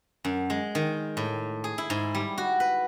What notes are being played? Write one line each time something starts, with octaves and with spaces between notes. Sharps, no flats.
F#2
G#3
D#3
A2
G#4
E4
G#2
G3
F#4
B4